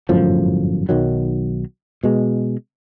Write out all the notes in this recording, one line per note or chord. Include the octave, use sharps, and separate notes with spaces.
G1 F#2 A2 F3
B1 D#3 F#3
B2 G#3